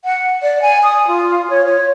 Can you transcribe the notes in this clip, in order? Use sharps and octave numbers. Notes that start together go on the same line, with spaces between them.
F#5
D5
G#5
D#6
F4
C#5
C#5